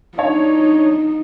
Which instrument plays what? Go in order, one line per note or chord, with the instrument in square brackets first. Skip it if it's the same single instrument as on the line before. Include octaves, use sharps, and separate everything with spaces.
[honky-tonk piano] D4 C#5 [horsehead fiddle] D#4